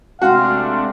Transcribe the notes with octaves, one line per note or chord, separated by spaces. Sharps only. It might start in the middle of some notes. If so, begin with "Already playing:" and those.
C3 G#3 A3 D4 F#4 F5 G5 C6